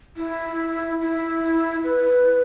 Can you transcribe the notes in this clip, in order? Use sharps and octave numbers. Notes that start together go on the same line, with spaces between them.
E4
E4
B4